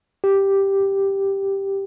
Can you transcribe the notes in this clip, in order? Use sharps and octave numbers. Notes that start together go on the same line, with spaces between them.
G4